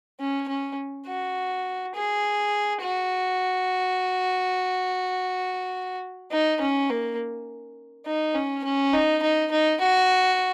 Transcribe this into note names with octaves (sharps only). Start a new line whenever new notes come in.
C#4
C#4
F#4
G#4
F#4
D#4
C#4
A#3
D#4
C#4
C#4
D#4
D#4
D#4
F#4